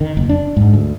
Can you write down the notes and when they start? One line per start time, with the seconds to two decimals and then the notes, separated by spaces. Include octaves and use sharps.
0.01 D#3
0.17 F#1
0.29 D4
0.57 G#2
0.74 D2